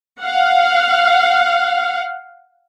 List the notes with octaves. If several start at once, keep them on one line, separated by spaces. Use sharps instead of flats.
F5 F#5